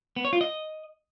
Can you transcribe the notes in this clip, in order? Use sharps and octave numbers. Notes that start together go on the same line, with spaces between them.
B3
C#5
F4
D#5